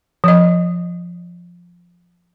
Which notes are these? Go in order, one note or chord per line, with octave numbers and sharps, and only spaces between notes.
F3 D#5